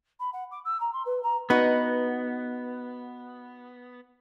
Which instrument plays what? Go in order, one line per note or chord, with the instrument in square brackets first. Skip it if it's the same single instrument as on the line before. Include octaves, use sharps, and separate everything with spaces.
[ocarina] B5
F#5
D6
E6
A#5
C6
B4
A#5
[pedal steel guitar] B3 [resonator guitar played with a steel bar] D#4 F#4 B4